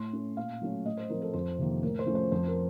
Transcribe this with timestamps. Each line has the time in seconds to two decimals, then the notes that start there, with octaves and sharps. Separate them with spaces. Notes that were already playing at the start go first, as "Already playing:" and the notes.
Already playing: A2 C6
0.13 A3 C#4
0.37 A#2 F5
0.62 F#3 A3 C#4
0.85 A2 D#5
0.97 C5
1.10 F3 C4 A#4
1.22 A4
1.33 F2 C5
1.58 C3 D#3 A#3
1.83 A2 A#4
1.99 C5
2.07 F3 A3 C#4
2.15 C5
2.32 F2 C5
2.47 A#4